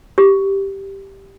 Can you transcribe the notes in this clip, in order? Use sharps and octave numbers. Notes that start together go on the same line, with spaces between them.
G4